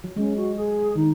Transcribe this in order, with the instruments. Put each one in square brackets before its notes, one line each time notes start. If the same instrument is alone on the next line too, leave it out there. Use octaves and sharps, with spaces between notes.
[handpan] F#3
[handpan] G#3 [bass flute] C#4
[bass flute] F#4
G#4
[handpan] D#3 [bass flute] D#4